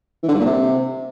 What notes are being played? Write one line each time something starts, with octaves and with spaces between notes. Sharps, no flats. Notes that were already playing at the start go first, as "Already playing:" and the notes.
E3
D3
G2
A#2
C3